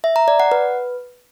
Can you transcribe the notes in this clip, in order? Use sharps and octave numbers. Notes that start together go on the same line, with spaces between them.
E5
A#5
D5
F#5
B4